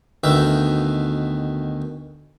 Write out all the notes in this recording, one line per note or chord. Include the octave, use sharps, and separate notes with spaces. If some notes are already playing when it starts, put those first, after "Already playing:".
D2 B2 D#3 E5